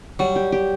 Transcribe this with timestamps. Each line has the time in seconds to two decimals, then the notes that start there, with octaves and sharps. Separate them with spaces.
0.19 F#3 G3
0.36 G4
0.52 G4